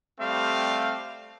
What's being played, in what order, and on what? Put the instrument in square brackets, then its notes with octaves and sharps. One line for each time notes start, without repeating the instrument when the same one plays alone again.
[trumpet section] G3 A3 C4 F5